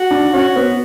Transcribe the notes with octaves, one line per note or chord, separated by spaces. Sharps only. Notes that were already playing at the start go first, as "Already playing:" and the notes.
Already playing: F#4
D4
C#4 F#4
B3